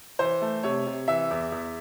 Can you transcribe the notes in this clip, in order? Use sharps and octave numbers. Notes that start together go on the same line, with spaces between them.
E3 C5
A3
C3 C#5
C3
E3 E5
E2
E2